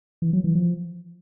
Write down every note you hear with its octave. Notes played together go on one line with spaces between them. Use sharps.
E3
F#3
E3
F3